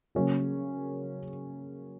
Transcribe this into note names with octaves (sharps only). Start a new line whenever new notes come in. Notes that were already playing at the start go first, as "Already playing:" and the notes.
C#3 F#3 A#3 C#4